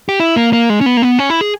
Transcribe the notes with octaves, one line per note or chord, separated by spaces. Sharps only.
G4
E4
A#3
A#3
G#3
C#4
B3
A#3
B3
C#4
E4
G#4